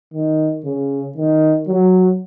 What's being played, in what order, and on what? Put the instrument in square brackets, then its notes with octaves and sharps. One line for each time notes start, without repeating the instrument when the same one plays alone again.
[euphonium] D#3
C#3
D#3
F#3